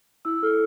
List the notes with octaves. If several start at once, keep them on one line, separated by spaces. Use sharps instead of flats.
E4 E6
A4 F6